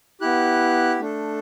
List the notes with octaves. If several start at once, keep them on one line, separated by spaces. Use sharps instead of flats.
B3 E4 G4 F#6
A3 D4 A4